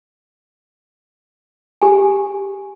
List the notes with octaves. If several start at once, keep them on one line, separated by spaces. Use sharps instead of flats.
G4 G#5